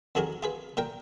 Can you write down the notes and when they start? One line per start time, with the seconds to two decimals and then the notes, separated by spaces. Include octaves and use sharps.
0.15 F2 D#3 F#4 G#4 A#4
0.43 F4 G#4 B4
0.77 A#2 A#4 G5